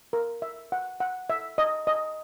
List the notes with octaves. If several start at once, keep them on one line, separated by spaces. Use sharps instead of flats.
A#4
E5
F#5
F#5
E5
D#5
D#5